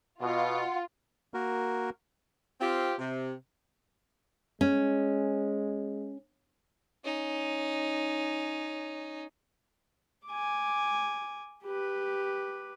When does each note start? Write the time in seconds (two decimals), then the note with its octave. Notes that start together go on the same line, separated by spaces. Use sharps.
0.21 B2 F4 F#5
1.34 A#3 F#4 A#4
2.60 C4 F4 G4
2.99 C3
4.61 G#3 C#4
7.04 C#4 D#4
10.27 G#5 D6
11.64 G4 B4